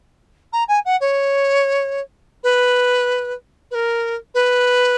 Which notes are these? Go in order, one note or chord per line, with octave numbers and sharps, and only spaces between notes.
A#5
G#5
F#5
C#5
B4
B4
A#4
B4